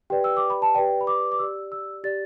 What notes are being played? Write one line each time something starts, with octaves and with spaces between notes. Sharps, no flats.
G4 B4 D5 G5
E6
D6
B5
A5
G4 B4 D5 G5
B5
D6
D6
G4 D5 E6
E6
G4 D5 A6